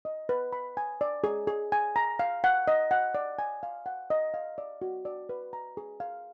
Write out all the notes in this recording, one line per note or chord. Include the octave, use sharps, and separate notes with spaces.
D#5
B4
B5
G#5
D5
G#4
G#4
G#5
A#5
F5
F#5
D#5
F#5
D5
G#5
F5
F#5
D#5
F5
D5
F#4
D5
B4
A#5
G#4
F5